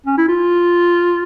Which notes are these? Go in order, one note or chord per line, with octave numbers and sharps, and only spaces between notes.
C#4
E4
F4